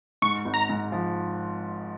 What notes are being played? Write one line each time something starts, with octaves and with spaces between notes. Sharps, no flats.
G#2 C#6
G#1
A#5
G#2
F3